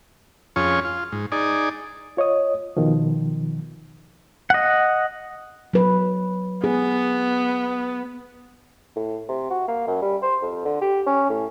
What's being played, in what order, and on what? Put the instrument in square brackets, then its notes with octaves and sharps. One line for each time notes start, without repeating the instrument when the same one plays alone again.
[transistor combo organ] F2 C#4 F4 G#4 C#5
F4
G#2
D#4 G#4 D5
[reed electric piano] F4 C#5 D#5 D#6
B2 D#3 F3
[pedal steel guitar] D#5 F#5
[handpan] F#3 B4
[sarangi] B3 [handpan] G#4
[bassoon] A2
C3
F#4
A#3
F#2
G3
C5
F2
D3
G4
C#4
A2